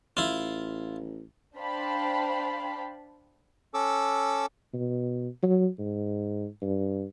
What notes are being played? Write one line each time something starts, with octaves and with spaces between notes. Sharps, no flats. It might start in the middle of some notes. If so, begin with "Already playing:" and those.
A1 E4 F4
D4 C5 F5 G5 A5 B5
C#4 A4 D6 E6
B2
F#3
G#2
G2